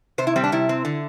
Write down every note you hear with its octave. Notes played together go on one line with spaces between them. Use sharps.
C3 C5
E4
G3 C4
D4
C3 E4
C4
D3